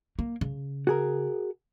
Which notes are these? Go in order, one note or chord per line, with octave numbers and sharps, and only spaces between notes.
A#3
C#3
F#4 G#4 A#4